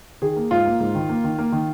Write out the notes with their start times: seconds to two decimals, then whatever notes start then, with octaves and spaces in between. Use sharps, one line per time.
0.22 D#3 G#4
0.36 A#3
0.51 G#2 F4
0.66 A#3
0.80 G#2
0.95 D#3
1.09 A#3
1.24 D#3
1.39 A#3
1.52 D#3